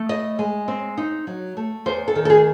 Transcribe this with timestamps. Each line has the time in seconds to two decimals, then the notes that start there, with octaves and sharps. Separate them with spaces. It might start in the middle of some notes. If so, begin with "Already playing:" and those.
Already playing: A3
0.09 E4 D#5
0.39 G#3
0.68 C4
0.97 D#4
1.27 F#3
1.57 A3
1.86 E2 C5
2.08 A4
2.15 D#3
2.25 A4
2.30 G#4